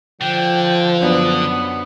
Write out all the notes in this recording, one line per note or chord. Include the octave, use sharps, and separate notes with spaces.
D3 F3 G5
F#2 B3 D4